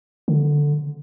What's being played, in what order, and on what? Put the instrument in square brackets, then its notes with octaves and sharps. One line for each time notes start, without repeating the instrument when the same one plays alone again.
[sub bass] D3